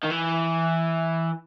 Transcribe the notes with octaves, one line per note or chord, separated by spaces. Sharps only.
D#3
E3